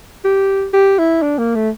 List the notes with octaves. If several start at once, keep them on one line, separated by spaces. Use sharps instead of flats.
G4
G4
E4
D4
A#3
A3